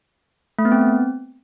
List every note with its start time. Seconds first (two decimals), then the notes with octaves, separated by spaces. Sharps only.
0.59 A3
0.65 B3
0.72 C4